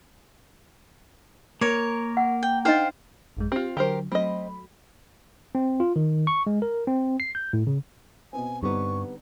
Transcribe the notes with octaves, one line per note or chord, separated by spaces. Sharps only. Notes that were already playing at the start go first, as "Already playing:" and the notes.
A#3 A#4 C#5
F#5
G5
D4 D#4 C5 D#5 F5 G5
A1 F#2 G#3
C4 F4 G4
D3 F#3 G4 A#4 C5
F#3 A3 C4 D#5 B5
C4
F4
D#3
C#6
G#3
A#4
C4
C7
G6
A2
C#3
B2 B3 C4 G#5
G2 D3 G3 B3 C4 D#4 C#6